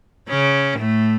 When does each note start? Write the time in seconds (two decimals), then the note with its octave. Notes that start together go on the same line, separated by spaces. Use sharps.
0.28 C#3 C#4
0.79 A2 A3